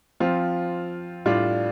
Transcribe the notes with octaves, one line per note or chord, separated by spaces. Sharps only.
F3 C4 F4
A2 G3 D4 F4